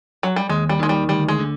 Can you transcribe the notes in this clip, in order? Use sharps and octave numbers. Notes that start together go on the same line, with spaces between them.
F#3
G3
D#2 G#3
G3
D#3 G#3
G3
D2 G3
G#3
D3